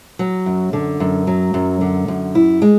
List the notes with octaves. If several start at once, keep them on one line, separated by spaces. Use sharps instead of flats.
F#3
F#2
D3
F#2
F#3
F#2
D3
F#2
E4
G#3